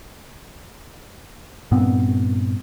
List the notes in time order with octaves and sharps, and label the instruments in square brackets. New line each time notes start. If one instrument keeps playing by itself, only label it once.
[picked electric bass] G2 A#2 B3 C4